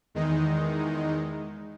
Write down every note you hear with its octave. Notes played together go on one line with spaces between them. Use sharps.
E2 D#3 G#3 D#4